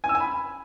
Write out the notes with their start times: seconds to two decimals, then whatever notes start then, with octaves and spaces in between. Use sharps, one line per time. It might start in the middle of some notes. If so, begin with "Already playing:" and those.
0.04 G#5
0.09 E6
0.15 G#5
0.20 B5